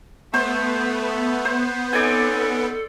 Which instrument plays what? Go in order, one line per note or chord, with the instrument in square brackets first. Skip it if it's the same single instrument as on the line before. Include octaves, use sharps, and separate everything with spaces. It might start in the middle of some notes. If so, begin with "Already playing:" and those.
[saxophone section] A3 [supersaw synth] B3 [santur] C5 C#6
[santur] C5
[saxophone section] C4 C#4 D#4 [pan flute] A4 [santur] D5 G#5